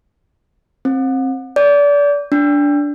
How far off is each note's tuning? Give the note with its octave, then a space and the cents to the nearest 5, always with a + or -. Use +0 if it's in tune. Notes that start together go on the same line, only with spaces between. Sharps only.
C4 +20
D5 -30
D4 -15